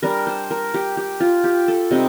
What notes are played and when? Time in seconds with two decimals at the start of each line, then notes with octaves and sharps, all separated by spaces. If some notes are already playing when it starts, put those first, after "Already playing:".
0.03 G3 D4 A#4
0.27 C5
0.51 A#4
0.74 G4
0.97 G4
1.20 F4
1.44 G4
1.68 A4
1.91 C3 G3 C4 D#4 D#5